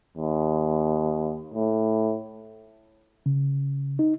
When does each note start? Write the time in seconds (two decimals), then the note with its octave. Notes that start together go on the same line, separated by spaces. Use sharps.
0.17 D#2
1.54 A2
3.26 C#3
3.99 D#4